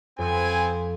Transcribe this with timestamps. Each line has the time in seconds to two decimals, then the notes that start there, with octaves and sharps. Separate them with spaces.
0.19 F2 B3 C4 G#5